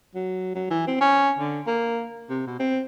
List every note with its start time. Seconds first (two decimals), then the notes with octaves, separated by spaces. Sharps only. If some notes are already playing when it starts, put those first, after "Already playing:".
0.15 F#3
0.55 F#3
0.70 E3
0.87 C4
1.01 C#4
1.39 D3
1.67 A#3
2.30 C3
2.47 B2
2.60 C4